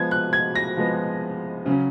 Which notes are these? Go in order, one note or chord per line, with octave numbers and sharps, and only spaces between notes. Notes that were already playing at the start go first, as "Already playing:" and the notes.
Already playing: F3 G#3 B3 G#6
F#6
G#6
A#6
F3 G#3 B3
C#3 F#3 C#4